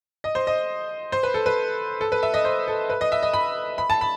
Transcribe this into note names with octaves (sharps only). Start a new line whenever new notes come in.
D#5
C5
D#5
C5
B4
A4
B4
A4
B4
E5
D#5
C5
A4
B4
D#5
E5
D#5
B5
B5
A5
B5